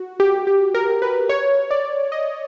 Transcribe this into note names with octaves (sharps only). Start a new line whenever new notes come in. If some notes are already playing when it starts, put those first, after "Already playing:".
Already playing: F#4
G4
G4
A#4
B4
C#5
D5
D#5